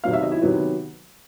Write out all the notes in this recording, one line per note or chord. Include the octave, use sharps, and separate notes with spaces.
C3 D#3 F#3 B3 F5
E5
D#5
E4 E5
C3 D#3 F#3 B3